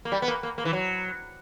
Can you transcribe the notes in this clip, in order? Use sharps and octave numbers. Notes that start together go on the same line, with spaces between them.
A#3
G3
B3
A#3
A#3
A#3
E3
F#3